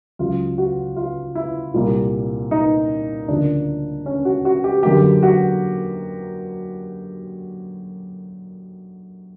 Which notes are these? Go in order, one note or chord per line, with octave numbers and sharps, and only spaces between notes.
C#2 C#3 F#3 F4
F#4
F4
E4
C2 A#2 G3 A#3
D#4
D2 C#3 F3 A#3 D4
C#4
F#4
F#4
G4
F#2 D3 F#3 A#3 G4
F#4